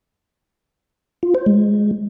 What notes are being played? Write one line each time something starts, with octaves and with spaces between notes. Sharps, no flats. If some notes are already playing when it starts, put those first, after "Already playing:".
F4
C5
G#3